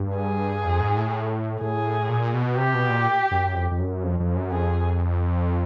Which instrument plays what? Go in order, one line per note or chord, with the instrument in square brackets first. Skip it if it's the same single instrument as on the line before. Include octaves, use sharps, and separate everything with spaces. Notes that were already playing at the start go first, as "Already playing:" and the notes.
Already playing: [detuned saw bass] G2
[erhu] G#4
[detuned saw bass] F2
G#2
A2
[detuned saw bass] A2 [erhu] G#4
[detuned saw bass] A#2
B2
[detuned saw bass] C3 [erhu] G4
[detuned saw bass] B2
A#2
F#2
F2
F2
F#2
F2
F2
F#2
[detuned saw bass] F2 [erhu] G#4